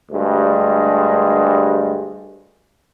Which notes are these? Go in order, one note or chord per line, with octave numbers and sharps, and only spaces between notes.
D2 G2 G#3